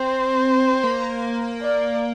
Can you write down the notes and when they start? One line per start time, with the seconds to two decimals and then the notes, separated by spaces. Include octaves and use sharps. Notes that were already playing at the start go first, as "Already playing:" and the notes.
Already playing: C4 C5
0.83 A#3
1.62 D5